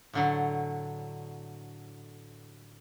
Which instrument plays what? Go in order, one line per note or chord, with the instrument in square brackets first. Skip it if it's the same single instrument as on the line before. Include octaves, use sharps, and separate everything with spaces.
[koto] A2 D3 F#3